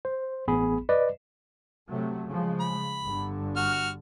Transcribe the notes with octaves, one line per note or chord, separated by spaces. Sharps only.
C5
A1 B3 G#4 B5
B4 D5 D#5
C3 F#3 A3
C#3 F3 G#3
B5
G1 G2 D3
F#4 F6